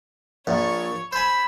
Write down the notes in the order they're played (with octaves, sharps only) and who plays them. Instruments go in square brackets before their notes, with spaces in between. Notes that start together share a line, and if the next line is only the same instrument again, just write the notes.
[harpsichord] A#1 A#2 [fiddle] C#5 C#6
[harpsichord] C5 G#5 [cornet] B5 [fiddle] E6